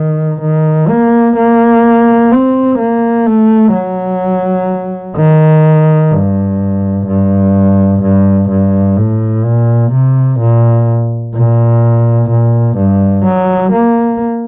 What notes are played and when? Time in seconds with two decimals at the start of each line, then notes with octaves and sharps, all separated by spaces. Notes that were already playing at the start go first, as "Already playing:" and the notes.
Already playing: D#3
0.42 D#3
0.88 A#3
1.37 A#3
2.32 C4
2.79 A#3
3.26 A3
3.74 F#3
5.17 D#3
6.12 G2
7.07 G2
8.02 G2
8.49 G2
8.97 A2
9.44 A#2
9.92 C3
10.40 A#2
11.34 A#2
12.30 A#2
12.77 G2
13.25 F#3
13.72 A#3